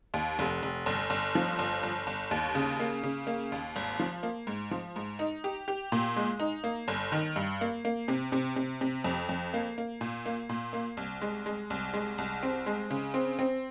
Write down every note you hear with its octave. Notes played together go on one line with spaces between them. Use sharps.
D#2
F1
F1
G1
G1
F3
G1
G1
G1
D#2
C#3
A#3
C#3
A#3
D#2
G#1
F3
A#3
G#2
F3
G#2
D#4
G4
G4
A#2
G#3
D#4
A#3
G1
D#3
G2
A#3
A#3
C3
C3
C3
C3
F2
F2
A#3
A#3
A#2
A#3
A#2
A#3
C2
G#3
G#3
C2
G#3
C2
C4
G#3
C#3
C4
C4